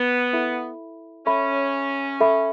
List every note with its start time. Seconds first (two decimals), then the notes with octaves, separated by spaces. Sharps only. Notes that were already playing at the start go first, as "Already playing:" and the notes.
Already playing: B3
0.33 E4 A4 E5 B5
1.26 C#4 A4 E5 B5
2.20 A4 E5 B5